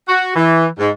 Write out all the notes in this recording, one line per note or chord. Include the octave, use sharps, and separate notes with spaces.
F#4
E3
G#2